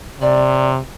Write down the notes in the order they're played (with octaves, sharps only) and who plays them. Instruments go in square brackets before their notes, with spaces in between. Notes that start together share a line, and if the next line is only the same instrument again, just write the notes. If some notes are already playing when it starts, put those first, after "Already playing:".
[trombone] C3 [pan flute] D5